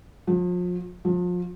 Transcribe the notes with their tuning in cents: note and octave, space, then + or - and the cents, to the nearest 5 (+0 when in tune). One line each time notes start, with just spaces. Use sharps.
F3 +35
F3 +30